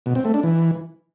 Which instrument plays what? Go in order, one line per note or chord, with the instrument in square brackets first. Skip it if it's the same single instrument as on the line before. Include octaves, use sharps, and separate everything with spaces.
[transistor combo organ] B2
C4
A3
D4
E3